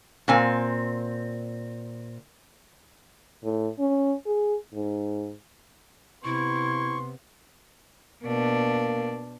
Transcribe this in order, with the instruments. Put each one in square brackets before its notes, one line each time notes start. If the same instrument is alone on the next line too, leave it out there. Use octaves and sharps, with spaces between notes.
[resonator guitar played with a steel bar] A#2 C4 G#5
[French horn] A2
C#4
G#4
G#2
[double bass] C3 B3 [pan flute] E4 [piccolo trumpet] C6 [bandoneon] C#6
[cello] B2 D4 [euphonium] A#3